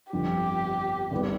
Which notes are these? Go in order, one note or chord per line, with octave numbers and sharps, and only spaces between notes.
G1 F2 D3 G4
G#1 G#2 G3 B3